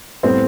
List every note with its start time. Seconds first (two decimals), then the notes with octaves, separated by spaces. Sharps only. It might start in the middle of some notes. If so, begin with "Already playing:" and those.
0.23 A2 G3 B3 C4